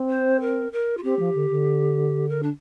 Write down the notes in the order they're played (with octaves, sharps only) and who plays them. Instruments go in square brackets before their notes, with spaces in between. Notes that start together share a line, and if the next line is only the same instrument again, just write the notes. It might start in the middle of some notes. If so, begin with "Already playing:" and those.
Already playing: [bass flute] C4
[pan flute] C5
A#4
A#4
F4
[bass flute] C4 [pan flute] G4
[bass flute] F3
D3
D3
[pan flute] A#4
D4